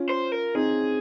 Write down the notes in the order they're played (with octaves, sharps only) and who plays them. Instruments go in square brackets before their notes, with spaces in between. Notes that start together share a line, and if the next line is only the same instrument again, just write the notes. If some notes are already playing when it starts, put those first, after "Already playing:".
Already playing: [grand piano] C#4 F4
[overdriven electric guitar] C5
A#4
[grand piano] C4 D#4 [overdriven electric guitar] G#4